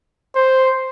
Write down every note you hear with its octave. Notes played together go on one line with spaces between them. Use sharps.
C5